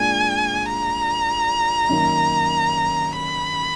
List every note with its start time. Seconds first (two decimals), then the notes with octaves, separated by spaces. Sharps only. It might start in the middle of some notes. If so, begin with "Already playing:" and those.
Already playing: A#2 G#3 D4 G#5
0.65 A#5
1.89 F#2 D#3 A#3
3.13 B5